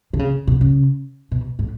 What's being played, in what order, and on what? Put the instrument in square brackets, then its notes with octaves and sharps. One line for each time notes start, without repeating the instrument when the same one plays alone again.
[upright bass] D3
C#3
B2
C#3
B2
A2